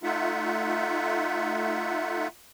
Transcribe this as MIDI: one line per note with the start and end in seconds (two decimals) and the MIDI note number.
0.03 2.28 57
0.03 2.28 63
0.03 2.28 65
0.03 2.28 76
0.03 2.28 78